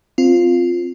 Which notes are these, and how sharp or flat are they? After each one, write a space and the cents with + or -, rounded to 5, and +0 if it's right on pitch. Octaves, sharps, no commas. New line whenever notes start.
C4 -10 F4 +0